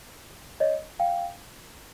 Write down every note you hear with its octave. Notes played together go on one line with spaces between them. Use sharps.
C#5 D#5
F5 G5